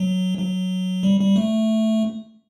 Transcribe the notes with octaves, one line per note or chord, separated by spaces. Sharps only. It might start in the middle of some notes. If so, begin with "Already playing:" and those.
Already playing: F#3
F#3
G3
G3
A3